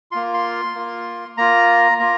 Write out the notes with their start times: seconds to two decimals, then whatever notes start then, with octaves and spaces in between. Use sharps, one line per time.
0.11 A#3 F4 C6
0.34 C6
0.74 A#3 F4
1.37 A#3 F4 A#5
1.99 A#3 F4 A#5